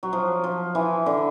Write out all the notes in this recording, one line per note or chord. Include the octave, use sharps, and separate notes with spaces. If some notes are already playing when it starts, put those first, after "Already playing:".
F#3
F3
F3
E3
D3